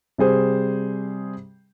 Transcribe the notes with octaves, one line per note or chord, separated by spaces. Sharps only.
C3 G3 G#4 C5